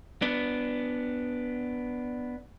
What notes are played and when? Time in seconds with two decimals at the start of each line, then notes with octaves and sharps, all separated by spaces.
0.22 B3 D4